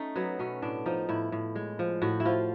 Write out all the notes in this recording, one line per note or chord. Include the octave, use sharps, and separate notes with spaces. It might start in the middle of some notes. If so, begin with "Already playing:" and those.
Already playing: A3 C#4 D#4
F#3 B3
B2 C#4
A2 D4
F3 D#4
A2 E4
A2
G#3
F3
A2 F#4
E4
F3 F4